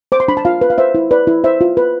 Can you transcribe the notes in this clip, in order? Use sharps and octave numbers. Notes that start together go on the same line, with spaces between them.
C5 D6
C6
D4 B5
A5
F4 F5
B4
F5
C5 E5
E4
B4 D5
E4
C5 E5
F4
B4